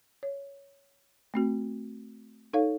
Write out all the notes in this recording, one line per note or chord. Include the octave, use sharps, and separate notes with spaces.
C#5
A3 C4 F#4
D#4 A4 C#5 F5